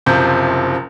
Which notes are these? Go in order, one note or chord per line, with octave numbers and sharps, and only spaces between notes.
F#1 C3 F3 G6